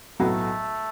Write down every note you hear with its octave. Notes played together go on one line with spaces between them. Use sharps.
B1 A2 F#3 A3 B3 F#4